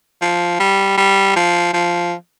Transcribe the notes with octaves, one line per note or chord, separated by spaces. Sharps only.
F3
G3
G3
F3
F3